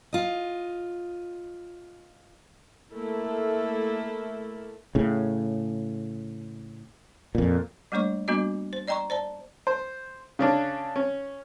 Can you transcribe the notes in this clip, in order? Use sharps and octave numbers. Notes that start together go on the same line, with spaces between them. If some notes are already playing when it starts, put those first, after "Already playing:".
F4 D#5
A3 A#3 E4 A4
A2 C#3
F2 A#2
G3 A3 A#3 D4 C#5 C#6
G3 A#3 B3 D4 F#4 D#5
C5
D5 D#5 G5 A#5 C6 C#6
C5 D5 A5
C5
C#3 C#4 D4
C#4